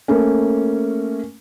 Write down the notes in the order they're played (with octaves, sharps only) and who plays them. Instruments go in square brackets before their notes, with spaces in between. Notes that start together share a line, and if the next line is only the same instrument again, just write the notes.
[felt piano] A3 A#3 C#4